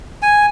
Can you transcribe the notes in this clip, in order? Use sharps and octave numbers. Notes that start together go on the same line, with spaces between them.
G#5